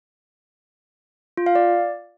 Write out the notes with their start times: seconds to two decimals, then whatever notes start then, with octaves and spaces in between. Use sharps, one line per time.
1.37 F4
1.46 F5
1.55 D5